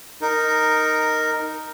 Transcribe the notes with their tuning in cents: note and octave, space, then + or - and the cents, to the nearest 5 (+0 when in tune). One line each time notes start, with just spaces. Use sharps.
D#4 +0 A#4 -5